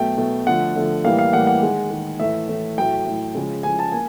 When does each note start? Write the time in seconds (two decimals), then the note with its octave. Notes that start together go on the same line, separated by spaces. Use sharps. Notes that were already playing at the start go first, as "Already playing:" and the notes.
Already playing: B2 F#3 A3 G5
0.18 B2 F#3 A3
0.47 D3 F3 A3 F#5
0.76 D3 F3 A3
1.04 A2 E3 G3 A#3 F5
1.19 F5
1.33 A2 E3 G3 A#3 F#5
1.47 F#5
1.63 D#3 G#3
1.91 D#3 G#3
2.20 A2 E3 A3 E5
2.48 A2 E3 A3
2.78 A2 F#3 A3 G5
3.06 A2 F#3 A3
3.34 C#3 F3 G#3
3.63 C#3 F3 G#3 G#5
3.79 A5
3.92 A#3 G#5